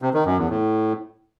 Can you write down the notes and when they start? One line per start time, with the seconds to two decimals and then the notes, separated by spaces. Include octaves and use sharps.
0.02 C3
0.14 D#3
0.26 F#2
0.38 E2
0.50 A2